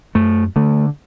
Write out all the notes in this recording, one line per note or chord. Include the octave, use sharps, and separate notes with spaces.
F#2 A3
D3 A3